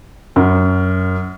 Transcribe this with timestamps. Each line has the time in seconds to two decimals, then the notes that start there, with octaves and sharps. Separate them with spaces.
0.36 F#2